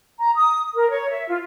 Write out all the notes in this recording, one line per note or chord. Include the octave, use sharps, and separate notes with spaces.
A#5
D#6
A#4
C#5
E5
F4